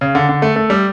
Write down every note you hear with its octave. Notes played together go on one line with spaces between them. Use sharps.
C#3
D3
D3
A3
A3
G3